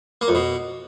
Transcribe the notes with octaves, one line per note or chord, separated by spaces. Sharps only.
A#3
F2
B2